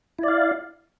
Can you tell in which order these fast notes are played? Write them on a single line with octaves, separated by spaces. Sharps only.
E4 D5 F5